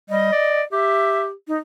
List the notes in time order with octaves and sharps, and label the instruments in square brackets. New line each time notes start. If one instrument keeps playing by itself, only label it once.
[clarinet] G3 [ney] D#5
[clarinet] D5
[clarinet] G4 [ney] E5
[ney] D#4